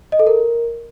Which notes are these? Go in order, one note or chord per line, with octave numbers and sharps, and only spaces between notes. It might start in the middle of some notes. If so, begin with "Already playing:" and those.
D#5
A4
A#4